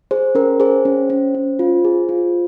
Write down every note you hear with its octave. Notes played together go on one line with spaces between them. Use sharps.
G#4 C5
C#4 A#4
G#4 C5
C#4
C#4
C#4
F4
G#4
F4